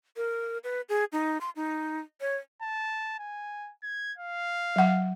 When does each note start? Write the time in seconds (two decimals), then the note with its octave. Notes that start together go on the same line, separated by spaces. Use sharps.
0.17 A#4
0.64 B4
0.89 G#4
1.12 D#4
1.41 C6
1.56 D#4
2.21 C#5
2.62 A5
3.19 G#5
3.83 G#6
4.18 F5
4.76 F#3 F#5